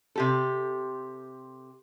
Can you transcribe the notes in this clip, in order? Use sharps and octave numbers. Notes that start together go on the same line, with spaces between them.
C3 G4 A4